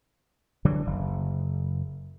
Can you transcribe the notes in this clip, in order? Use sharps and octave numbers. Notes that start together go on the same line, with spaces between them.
D3 E3 F#3 G3
F#1